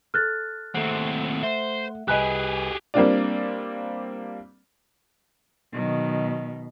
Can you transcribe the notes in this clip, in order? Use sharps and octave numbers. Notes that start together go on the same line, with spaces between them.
A4 F6 F#6 A6
D#2 A3 C4 F#5
C5 E5
C2 G4 G#4 B4 D#5 G#5 B5 F#6
G3 A#3 C4 D4 F4 D5
B2 D#3 F#3